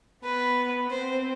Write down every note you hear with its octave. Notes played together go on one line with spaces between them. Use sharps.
B3 B4
C4 C5